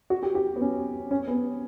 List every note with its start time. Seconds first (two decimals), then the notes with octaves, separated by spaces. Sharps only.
0.10 F#4
0.23 G4
0.35 G4
0.56 B3
0.61 C#4
1.11 C#4
1.28 B3